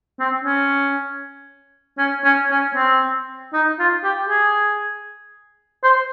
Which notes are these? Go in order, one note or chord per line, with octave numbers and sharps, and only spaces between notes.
C4
C#4
C#4
C#4
C#4
C4
D#4
F4
G4
G#4
C5